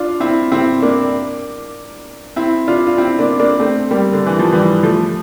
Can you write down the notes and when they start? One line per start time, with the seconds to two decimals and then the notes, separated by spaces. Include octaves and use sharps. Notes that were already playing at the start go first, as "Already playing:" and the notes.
Already playing: D4 F4
0.20 C4 E4
0.52 C4 E4
0.82 A#3 D4
2.36 C4 E4
2.68 D4 F4
2.87 F4
2.98 C4 E4
3.19 A#3 D4
3.39 A#3 D4
3.60 A3 C4
3.91 G3 A#3
4.13 D3
4.26 E3
4.39 F3
4.53 E3 G3
4.83 F3 A3